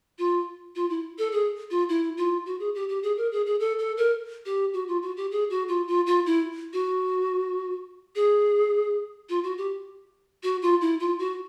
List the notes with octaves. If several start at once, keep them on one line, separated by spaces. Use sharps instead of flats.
F4
F4
E4
A4
G#4
F4
E4
F4
F#4
G#4
G4
G4
G#4
A#4
G#4
G#4
A4
A4
A#4
G4
F#4
F4
F#4
G4
G#4
F#4
F4
F4
F4
E4
F#4
G#4
F4
F#4
G4
F#4
F4
E4
F4
F#4